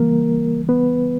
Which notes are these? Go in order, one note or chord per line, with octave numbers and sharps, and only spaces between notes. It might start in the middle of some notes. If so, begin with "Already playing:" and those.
Already playing: C#3 E3 G3 A#3 A#4
B3 B4